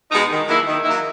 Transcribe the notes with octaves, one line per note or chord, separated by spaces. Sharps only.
B2 G#3 D#4
D#3
F#3 A#3 E4
D#3
F#3 A#3 E4